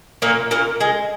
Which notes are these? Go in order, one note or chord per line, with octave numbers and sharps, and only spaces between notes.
A#2 A#3
A#2 A#3
G#3